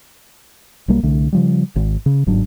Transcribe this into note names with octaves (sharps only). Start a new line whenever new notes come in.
B1 F#3 G3 A#3
C2 D3 A3
C#3 F3 G3
G#1
C#3
G1 G#2 F#3 D4